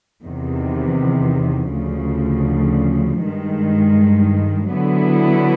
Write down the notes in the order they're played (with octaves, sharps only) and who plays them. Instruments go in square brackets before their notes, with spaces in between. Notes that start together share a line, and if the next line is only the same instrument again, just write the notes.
[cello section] E2 C3 D#3
D2 C#3 F3
G2 D#3 G#3
D3 F#3 B3 E4